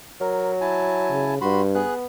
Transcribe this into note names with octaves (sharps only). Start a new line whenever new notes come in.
F#3 A#4
E4 G#5 A5
C#3
G2 F#4 B5 C6
B3 G#4 F#6